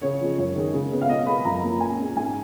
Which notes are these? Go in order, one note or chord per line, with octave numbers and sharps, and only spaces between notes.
C#3 C#5
F3 G#3
F#2 C#5
D#3 G#3
C#3
G#3 B3
F5
B2 D#5
G#3 B3 B5
F#2 A#5
F3 A#3 C#4
A#2 G#5
G#3 C#4
G#2 G#5